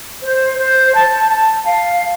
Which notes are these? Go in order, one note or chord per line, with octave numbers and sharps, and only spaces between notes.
C5
C5
A5
A5
F5